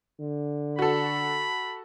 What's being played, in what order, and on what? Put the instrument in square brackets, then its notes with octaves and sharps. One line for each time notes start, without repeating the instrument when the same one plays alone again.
[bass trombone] D3
[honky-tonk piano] F#4 A4 [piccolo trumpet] B5